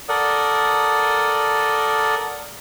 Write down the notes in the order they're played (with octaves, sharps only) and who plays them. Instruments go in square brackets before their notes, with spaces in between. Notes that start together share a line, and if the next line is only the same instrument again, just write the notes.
[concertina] A4 A#4 D5 F#5 D#6